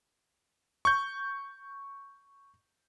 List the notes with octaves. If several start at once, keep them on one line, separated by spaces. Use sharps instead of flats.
C#6 G6